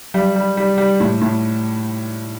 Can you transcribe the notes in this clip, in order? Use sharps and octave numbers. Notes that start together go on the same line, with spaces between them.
F#3 G3
G3
G3
G3
A2
A2